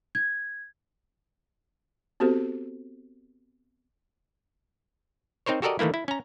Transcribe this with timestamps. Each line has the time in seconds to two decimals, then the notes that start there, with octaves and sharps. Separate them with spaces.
0.15 G#6
2.20 B3 C4 F#4 G4 A4 C5
5.46 C4 D#4 A#4 C5 C#5
5.62 F#4 G4 A4 A#4 D5 D#5
5.79 D#3 E3 A3 A#3 E4
5.94 E4
6.08 C#4 A#5